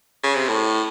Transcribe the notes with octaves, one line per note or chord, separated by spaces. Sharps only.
C#3
C3
A2